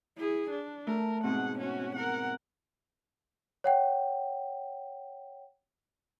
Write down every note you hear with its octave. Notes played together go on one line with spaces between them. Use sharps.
E4 G#4
D4
A3 A#4
G#2 B2 C4 G#4 F#5
C#4 F#4
A#4 F#5
C#5 F#5 G5